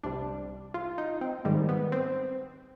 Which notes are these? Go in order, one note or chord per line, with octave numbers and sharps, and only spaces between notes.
C2 C3 G3 D4
F4
D#4
C4
G#2 D#3 G3 G#3
B3
C4